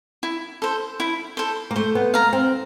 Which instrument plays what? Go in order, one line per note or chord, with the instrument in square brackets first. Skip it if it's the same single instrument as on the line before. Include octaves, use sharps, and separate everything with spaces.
[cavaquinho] E4
A4 C5
E4
A4 C5
[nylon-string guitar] A#3
[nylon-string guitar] A3 [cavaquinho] C5
[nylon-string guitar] B3
[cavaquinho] F5 A#5
[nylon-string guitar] C4